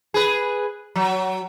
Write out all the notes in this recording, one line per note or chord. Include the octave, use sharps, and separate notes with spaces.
G#4 B4
F#3